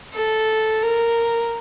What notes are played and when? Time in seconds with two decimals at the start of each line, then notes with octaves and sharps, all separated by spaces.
0.14 A4
0.82 A#4